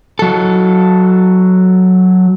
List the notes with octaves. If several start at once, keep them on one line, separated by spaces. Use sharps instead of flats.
F#3 A4